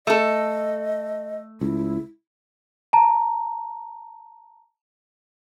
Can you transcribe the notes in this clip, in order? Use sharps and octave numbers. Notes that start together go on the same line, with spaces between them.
A3 A4 D#5
C#2 E4
A5 A#5